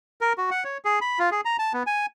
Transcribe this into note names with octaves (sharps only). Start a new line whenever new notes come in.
A#4
F#4
F#5
C#5
G#4
B5
F4
G#4
A#5
A5
B3
G#5